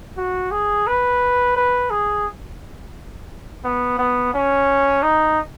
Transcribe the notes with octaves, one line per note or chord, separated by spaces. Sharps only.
F#4
G#4
B4
B4
G#4
B3
B3
C#4
D#4